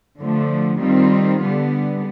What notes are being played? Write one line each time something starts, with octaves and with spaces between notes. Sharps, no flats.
D3 F3 A3
D#3 G3 C4 F4
D3 G3 B3